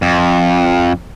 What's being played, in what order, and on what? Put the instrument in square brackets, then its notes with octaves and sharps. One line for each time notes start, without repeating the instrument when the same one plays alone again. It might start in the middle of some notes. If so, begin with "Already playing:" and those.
[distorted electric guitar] F2